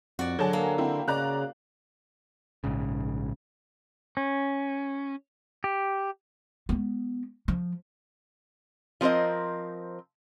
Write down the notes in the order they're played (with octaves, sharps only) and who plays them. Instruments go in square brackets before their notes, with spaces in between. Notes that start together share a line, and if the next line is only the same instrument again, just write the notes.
[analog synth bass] F2 [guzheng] F#4 D5
[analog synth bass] D3 [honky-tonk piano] F#3 G#4 A5
[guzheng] A#3
[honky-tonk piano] C4 E4
[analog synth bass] C#3 [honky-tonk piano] D5 A#5 F#6
[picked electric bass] A#1 G#2 C#3
[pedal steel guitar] C#4
G4
[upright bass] G#3 B3
F3
[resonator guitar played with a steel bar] F3 C4 A#4 C5 D#5